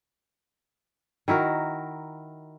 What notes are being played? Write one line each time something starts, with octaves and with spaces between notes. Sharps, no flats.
D#3 E4 F#4 A#4